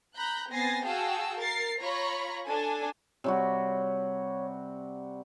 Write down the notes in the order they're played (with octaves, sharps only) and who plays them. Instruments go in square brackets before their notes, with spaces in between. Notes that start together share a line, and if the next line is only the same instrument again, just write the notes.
[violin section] A#5 B5 F#6 G6
B3 C4 G#5 A6 A#6 C7
F#4 G#4 F5 G5 A5 E6
A#4 A6 C7
F4 C#5 A#5 B5 C#6
D4 A4 G#5
[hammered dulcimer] C3 G3 F#4 [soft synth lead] C#5